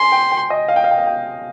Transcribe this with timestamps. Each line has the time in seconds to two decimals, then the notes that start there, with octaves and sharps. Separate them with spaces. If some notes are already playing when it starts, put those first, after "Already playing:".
Already playing: G#5 C6
0.12 G5
0.31 G5
0.50 D#5
0.68 F5
0.76 G5
0.84 F5
0.91 G5
0.98 F5
1.06 G5